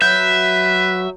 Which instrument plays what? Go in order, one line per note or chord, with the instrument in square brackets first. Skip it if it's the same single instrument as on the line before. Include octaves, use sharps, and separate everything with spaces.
[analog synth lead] F#3 [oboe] B4 [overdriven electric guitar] E5 [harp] G6